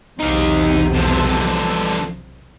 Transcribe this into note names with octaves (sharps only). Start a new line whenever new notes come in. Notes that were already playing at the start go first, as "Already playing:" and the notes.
B1 E2 C3 D#4 F5
D3 F3